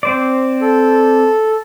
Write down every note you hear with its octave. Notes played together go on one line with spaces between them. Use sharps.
C4 C5 D5
A4